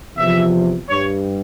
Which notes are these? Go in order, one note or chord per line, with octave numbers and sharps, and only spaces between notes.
E2 C3 F3 E5
G2 G3 C#5